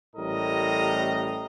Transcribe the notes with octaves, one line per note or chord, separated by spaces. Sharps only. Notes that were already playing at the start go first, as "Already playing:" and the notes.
A1 A2 G3 A#4 D#5 A#5